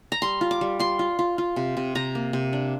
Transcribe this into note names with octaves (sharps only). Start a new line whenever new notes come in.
A#5
G3 C6
F4
D6
G3
F4 C6
F4
F4
F4
C3
C3
C3 A#5
A#3
C3
D4